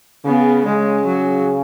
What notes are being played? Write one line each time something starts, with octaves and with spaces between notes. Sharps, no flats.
C#3 B3
C#3 G#3
F#3